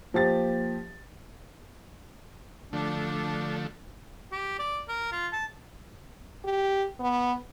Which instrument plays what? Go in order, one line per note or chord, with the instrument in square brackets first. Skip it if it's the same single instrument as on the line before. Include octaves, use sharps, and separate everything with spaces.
[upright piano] F3 G4 A6 [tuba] A#3
[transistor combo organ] D3 F3 A3 [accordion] D4
[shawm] G4
D5
A#4
F4
A5
[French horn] G4
B3